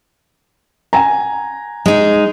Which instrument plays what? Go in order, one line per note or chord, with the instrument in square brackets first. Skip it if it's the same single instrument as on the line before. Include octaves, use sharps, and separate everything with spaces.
[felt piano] F#5 G#5 A#5
[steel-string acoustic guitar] G#3 D#4